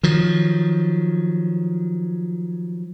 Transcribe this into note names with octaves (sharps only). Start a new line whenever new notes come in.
D#3 F3 F#3